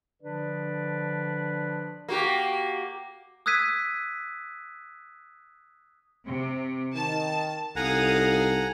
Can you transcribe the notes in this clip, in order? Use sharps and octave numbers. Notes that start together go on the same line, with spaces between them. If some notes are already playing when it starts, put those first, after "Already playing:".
D3 F3 D4 B4 D5
A#3 F#4 G4
D#6 E6 F#6 G#6 B6 D#7
C3
D#3 A5
C2 D#4 A4 F5 F#5 G#5 A#5 D#6